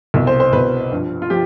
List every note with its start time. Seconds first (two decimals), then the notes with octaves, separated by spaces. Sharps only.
0.14 C2 B2
0.27 C5
0.40 C5
0.53 C2 B2 B4
0.92 G2 F3
1.22 F4
1.30 F3 G4